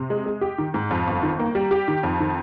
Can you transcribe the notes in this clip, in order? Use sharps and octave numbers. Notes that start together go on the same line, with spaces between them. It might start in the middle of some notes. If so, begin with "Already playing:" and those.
Already playing: C3
G#3
G#3
G4
D#3
G#2
F2
G1
D#3
A#3
G3
G4
D#3
F2
D#3